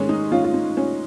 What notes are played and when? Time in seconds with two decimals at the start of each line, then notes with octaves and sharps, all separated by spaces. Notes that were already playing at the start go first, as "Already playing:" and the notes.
Already playing: G#2 D#3 G#3 C#4
0.09 D#4
0.32 C#4 F4
0.44 F4
0.54 D#4
0.77 C#4